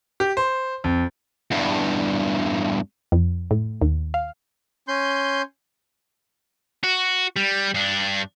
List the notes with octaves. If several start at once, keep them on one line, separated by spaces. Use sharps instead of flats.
G4
C5
F2
E2 G2
F2
A2
D#2
F5
C#4 C6 G6
F#4
G3
G2 D4